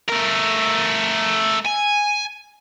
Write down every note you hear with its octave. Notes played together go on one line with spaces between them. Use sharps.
A3 A#4
G#5